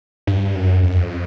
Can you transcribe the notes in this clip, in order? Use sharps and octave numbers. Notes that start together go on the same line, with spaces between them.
G2
F#2
F2
F#2
F2